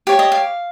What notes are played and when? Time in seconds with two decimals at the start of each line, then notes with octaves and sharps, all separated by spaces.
0.07 G4 C#5 F5
0.19 D#5
0.32 F5